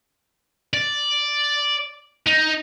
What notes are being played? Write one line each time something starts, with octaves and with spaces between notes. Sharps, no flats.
D5
D#4